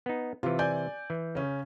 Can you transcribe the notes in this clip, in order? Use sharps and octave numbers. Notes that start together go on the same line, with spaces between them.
B3 D#4
C3 E3 F4
D5 G#5 G6
E3
C#3 C#4